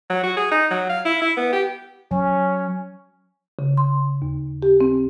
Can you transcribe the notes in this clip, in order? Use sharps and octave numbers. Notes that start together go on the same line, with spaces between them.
F#3
F#4
G#4
D#4
F#3
F5
E4
E4
B3
G4
F#3 C#4
C#3
C6
D#2
G4
C4